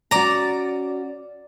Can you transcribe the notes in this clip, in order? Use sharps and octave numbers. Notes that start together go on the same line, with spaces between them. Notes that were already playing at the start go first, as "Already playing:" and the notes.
C#4 F#4 D5 A#5